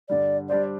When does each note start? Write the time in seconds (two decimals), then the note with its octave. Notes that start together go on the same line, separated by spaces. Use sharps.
0.09 G2 D3 G3 D5
0.49 G3 D4 G4 C5 D5